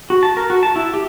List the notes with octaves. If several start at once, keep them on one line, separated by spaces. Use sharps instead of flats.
F#4
A5
A#4
F#4
A5
E4
G4